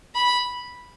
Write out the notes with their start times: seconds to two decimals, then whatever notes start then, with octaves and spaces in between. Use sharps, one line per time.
0.15 B5